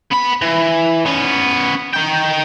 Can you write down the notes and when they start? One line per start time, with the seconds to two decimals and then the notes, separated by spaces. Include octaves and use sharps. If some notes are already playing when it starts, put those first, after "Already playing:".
0.12 B3 B5
0.42 E3
1.06 B3 C#4
1.93 D#4 G5